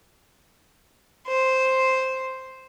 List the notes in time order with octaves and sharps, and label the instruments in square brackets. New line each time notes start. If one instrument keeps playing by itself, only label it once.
[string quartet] C5